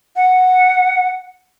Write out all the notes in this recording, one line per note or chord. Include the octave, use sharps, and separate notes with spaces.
F#5